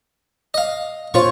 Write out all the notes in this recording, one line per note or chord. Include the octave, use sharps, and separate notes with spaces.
D#5 F5
A#2 F4 C5 C#5 C#6